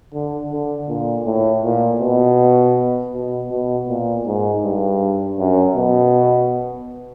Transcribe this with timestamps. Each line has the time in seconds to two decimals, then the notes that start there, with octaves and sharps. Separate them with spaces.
0.14 D3
0.52 D3
0.89 A#2
1.26 A2
1.64 A#2
2.01 B2
3.14 B2
3.51 B2
3.89 A#2
4.26 G#2
4.64 G2
5.39 F#2
5.76 B2